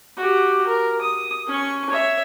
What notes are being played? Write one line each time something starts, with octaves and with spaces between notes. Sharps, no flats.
F#4 G4
A#4
D#6
C#4 C#6
C#5 E5